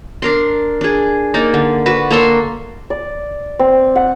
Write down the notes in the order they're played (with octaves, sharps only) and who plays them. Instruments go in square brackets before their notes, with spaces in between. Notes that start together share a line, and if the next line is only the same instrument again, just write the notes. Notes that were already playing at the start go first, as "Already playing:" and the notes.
[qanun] D4 A#4 C6
D4 G#4
A#3 D#4 D5
D3
F#4 B4 A5
A#3 A4 E5 C6
[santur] D5
C4
F#5